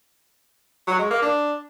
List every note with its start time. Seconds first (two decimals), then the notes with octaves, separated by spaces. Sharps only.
0.87 F#3
0.99 G#3
1.10 A#3
1.22 D4